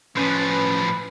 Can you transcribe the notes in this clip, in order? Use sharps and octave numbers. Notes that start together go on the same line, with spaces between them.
A2 F3 C#4 B4